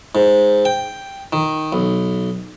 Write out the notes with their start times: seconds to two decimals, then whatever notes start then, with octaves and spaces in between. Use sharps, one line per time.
0.15 G#2
0.65 G5
1.33 D#3
1.73 B1